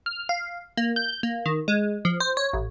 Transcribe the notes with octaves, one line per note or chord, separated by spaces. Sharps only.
F6
F5
A#3
G6
A#3
D#3
G#3
F3
C5
C#5
A1